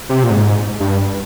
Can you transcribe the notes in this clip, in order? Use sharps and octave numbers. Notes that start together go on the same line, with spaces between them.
C3
A#2
G#2
G2